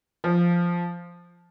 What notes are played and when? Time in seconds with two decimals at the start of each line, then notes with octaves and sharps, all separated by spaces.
0.24 F3